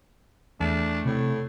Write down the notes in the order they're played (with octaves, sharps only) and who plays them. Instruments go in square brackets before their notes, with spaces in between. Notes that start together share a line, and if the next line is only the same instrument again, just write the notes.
[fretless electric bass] E2 [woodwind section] A3 [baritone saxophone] D4
[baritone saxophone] A2 [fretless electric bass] C3